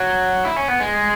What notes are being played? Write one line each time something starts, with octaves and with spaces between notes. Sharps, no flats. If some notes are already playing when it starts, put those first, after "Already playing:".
Already playing: F#3
E4
C#4
B3
G#3